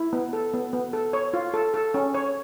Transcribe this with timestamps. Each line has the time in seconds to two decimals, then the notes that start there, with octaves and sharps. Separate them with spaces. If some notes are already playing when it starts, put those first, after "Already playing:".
Already playing: E4
0.13 B3
0.33 A4
0.53 B3
0.73 B3
0.93 A4
1.13 C#5
1.34 F4
1.54 A4
1.74 A4
1.94 C#4
2.14 C#5